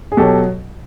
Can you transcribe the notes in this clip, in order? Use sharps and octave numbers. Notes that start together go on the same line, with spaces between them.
G#4
B2 F#3 G4 A4